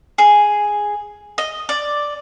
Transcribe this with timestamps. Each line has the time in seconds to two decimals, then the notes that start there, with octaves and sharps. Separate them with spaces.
0.18 G#4
1.38 D#5
1.69 D5